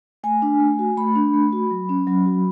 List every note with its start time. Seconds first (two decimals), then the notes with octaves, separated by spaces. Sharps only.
0.24 A3 G#5
0.42 D4
0.60 A3
0.79 F#4
0.97 A3 B5
1.16 D4
1.34 A3
1.52 F#4
1.71 F#3
1.89 C#4
2.07 F#3
2.26 F#4